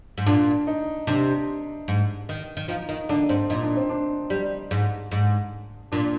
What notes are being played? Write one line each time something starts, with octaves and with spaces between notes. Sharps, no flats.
G#2
A#2 D4
D#4
C3 D4
G#2
D#3
D#3
F3 D#4
D#3 D#4
D3 D4
G#2 C4
A#2 D#4
D4
C4
D4
G3
G#2
G#2
A#2 D4